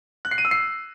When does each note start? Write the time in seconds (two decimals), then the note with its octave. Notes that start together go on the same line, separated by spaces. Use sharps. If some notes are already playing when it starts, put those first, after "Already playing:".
0.25 F#6
0.31 C7
0.38 D#7
0.45 E6
0.51 C7